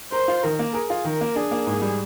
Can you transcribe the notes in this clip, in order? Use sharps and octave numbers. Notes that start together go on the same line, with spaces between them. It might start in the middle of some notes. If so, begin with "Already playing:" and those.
A#4 C5
F4
D#3 A#4
A#3
G#4 A#4
F4
D#3 A#4
A#3
D4 G#4
A#3
G#2
G3